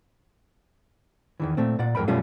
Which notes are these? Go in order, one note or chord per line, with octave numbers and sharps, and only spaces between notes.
E2 D#3 E3
A#2 A3 C4
A#2 D5 F#5
F2 G#2 A#4 G5 B5
F#2 B2 G3 A3 C#4 F4